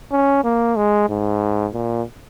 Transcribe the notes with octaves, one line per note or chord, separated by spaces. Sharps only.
C#4
A#3
G#3
G#2
A#2